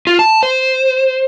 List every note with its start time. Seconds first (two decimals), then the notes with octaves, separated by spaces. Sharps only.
0.07 F4
0.19 A5
0.43 C5